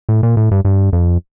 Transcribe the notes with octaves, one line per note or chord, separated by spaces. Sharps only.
A2
A#2
A2
G2
G2
F2